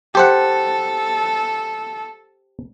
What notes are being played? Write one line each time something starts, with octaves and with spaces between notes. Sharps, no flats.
G4 A4 C5 F#5